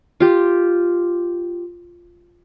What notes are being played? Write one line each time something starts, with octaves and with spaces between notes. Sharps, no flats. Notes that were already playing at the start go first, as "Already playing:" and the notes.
F4 G4